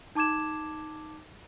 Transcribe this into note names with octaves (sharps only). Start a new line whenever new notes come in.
D#4 A5 D6 G#6 E7